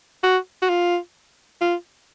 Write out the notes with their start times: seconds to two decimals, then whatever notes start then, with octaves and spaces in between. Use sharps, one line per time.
0.23 F#4
0.62 F#4
0.69 F4
1.61 F4